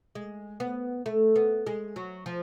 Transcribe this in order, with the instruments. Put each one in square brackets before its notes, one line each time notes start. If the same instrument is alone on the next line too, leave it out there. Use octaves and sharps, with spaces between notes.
[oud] G#3
B3
A3
B3
G#3
F#3
F3